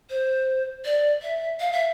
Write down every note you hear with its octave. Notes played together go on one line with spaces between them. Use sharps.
C5
D5
E5
F5
E5